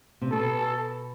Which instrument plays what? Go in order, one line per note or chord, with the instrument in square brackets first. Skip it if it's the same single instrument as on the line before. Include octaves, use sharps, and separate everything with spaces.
[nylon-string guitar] C3
[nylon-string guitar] B2 [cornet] A4